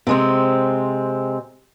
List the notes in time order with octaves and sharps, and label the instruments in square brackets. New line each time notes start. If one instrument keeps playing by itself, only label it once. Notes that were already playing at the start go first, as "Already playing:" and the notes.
[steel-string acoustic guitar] C3 G#3 C4